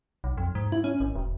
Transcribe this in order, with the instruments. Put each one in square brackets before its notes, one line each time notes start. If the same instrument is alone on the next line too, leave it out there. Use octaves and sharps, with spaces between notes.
[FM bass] B1
F2
G#2
E4
C#4
G#1
E1